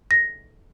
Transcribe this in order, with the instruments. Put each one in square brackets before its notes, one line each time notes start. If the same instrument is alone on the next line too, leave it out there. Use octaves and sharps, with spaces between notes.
[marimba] A#6